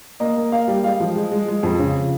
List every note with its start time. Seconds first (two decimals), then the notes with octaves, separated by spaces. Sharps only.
0.20 A#3 D#5
0.37 A#3
0.52 A#3 F5
0.68 G3
0.84 G#3 F5
1.00 F3
1.16 G#3
1.32 G#3
1.48 G#3
1.63 F2
1.79 C#3